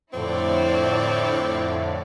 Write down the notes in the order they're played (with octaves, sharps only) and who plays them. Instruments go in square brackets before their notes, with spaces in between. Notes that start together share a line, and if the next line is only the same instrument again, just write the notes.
[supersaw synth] F2 A2 D3 [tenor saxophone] C4 [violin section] E4 C#5 D5